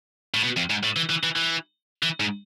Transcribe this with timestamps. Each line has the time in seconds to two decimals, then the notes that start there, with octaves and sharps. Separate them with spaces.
0.34 A2
0.44 B2
0.57 F2
0.70 G#2
0.83 A2
0.96 E3
1.10 E3
1.23 E3
1.36 E3
2.03 E3
2.20 G#2